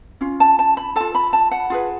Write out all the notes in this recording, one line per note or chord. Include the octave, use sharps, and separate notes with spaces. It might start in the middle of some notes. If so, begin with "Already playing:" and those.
C#4 F4
A5
A5
B5
F4 A4 A5
B5
A5
F#5
F4 G#4 B4